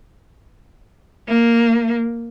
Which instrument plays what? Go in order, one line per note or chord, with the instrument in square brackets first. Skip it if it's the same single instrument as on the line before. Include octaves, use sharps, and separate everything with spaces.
[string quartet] A#3